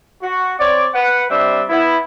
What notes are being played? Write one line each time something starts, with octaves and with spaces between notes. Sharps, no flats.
F#4
C4 C#5 D5
B4 F#5
G3 C4 D4 E5
B3 E4